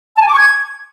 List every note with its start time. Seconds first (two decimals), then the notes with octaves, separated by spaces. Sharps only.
0.16 A5
0.21 G#5
0.27 D6
0.32 C#6
0.38 G#6